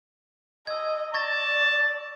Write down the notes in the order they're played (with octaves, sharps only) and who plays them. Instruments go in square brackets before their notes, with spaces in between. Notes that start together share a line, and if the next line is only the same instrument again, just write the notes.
[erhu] D#5 [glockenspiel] E6 G#6
[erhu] D5 [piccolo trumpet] A5 [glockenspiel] C#6 G#6 A#6